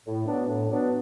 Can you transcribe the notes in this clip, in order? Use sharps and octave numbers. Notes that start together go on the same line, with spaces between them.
A2
F#3 B3 D4
A2
F#3 B3 D4